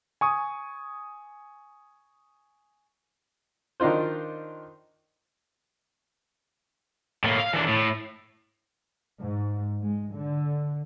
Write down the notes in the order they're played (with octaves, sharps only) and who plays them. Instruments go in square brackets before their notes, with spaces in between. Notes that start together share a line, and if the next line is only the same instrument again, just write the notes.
[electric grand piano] G#5 C#6 D#6
[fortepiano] D#3 D4 D#4 F4 C5
[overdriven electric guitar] A2 A#3
F5
E3 D4
A2
[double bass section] G#2
G#3
D3